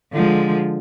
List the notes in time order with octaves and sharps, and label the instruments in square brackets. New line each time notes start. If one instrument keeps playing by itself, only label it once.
[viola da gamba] D3 F3 G#3